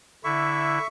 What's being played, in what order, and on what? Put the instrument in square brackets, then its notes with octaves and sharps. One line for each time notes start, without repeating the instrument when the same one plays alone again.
[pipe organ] D3 E4 [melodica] E5 C#6